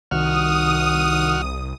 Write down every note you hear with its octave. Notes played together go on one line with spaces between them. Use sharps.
C2 D#3 F#4 D#6 F6